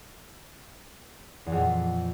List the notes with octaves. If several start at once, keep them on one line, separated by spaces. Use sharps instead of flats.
E2
F2
A#2